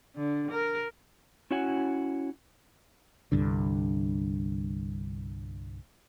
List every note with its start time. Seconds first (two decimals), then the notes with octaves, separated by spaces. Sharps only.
0.16 D3
0.51 A#4
1.51 C#4 E4 F#4 C#5 F#5 G#5
3.32 C2 G2 D3